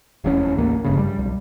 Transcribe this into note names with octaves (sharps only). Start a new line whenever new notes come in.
F1 E2 C#4
A1 D#2 A#3
F1 G2 C#3
G3
B1